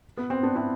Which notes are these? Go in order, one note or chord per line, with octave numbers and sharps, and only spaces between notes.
B3
C4
B3 D4
C4 E4